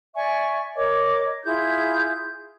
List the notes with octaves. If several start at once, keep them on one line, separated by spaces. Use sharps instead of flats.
D5 E5 G#5 C#6
A#4 C#5 D#5 D6
E4 F4 G#4 G6